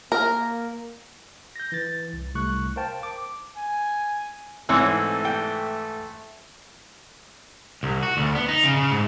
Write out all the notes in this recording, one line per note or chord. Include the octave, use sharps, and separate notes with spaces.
A#3 A#4
G6 A#6
E3 A6
C2
C2 A3 C#6 F#6
A#4 C5 F5 G5 A5
D6
G#5
G#2 E3 A3 C4 E4 C#5 E6
G5
C2
F#4
D2
B3
D#4
C#3
C#3
G#2